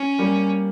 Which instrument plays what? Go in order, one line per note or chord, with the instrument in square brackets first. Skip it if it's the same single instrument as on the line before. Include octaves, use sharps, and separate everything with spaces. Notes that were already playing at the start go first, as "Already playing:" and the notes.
Already playing: [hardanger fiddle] C#4
[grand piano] G3 A#3